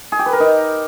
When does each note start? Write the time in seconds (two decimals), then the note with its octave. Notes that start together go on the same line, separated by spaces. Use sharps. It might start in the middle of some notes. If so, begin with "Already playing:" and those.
0.12 G#4
0.19 G4
0.26 B4
0.33 A#4
0.40 D#4